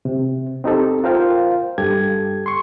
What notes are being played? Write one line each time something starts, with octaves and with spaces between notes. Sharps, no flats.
C3
C4 D#4 G4 A4
F4 A#4 C5 F5 G5
G2 G4 A4 G#6
C6 C#6